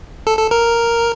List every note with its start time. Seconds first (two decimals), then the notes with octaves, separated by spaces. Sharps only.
0.27 A4
0.38 A4
0.51 A#4